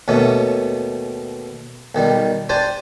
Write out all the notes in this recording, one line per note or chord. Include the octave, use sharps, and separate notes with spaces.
D#2 B2 A3 C#4
B1 D#3 G3
D4 G4 C5 G#5 A5 C6